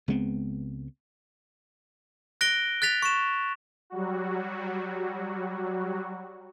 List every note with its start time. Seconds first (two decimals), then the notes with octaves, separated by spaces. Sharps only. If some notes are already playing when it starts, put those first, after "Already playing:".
0.08 C#2 G#3 B3 C4
2.41 F#6 A#6 D7 G7
2.82 F#6 A6 B6 F7
3.02 C#6 E7
3.90 F#3 G3 F#4